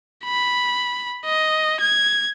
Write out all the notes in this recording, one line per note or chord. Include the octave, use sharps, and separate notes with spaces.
B5
D#5
G#6